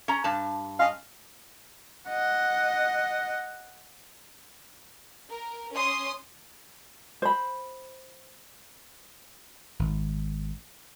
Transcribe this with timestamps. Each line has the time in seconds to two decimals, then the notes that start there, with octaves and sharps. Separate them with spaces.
0.08 C#4 A#5
0.24 G2 A5
0.79 C#4 D#5 F5
2.09 D#5 F#5
5.30 A#4
5.74 C#4 C6 D#6
7.22 C5 B5
9.79 G#1